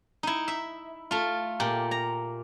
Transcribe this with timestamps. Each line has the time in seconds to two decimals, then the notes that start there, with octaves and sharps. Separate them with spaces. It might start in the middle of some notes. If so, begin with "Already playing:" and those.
0.23 D#4 E4
0.48 E5
1.11 A3 F4
1.60 A#2 G4
1.91 A#5